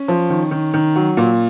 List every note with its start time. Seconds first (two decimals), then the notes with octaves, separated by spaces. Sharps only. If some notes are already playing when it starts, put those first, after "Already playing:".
Already playing: C#4
0.08 F3
0.30 D#3
0.51 D#3
0.74 D#3
0.96 F#3
1.17 A#2